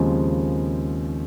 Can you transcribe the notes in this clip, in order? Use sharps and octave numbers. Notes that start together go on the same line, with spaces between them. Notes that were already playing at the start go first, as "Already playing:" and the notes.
Already playing: D#2 C#3 F3 G#3 C4